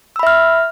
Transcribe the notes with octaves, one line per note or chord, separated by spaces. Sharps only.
E5 B5 E6 F6